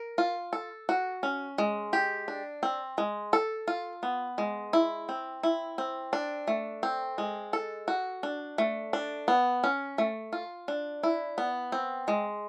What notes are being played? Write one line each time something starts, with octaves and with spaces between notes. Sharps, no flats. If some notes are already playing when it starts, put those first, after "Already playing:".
Already playing: A#4
F4
A4
F#4
C#4
G#3
G4
D4
C4
G#3
A4
F4
B3
G#3
E4
C4
E4
C4
D4
A3
C4
G#3
A4
F#4
D4
A3
D4
B3
C#4
A3
F4
D4
E4
B3
C4
G#3